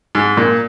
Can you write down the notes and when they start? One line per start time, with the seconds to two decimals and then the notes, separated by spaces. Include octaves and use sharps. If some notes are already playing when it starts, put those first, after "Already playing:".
0.15 G#2
0.37 A#2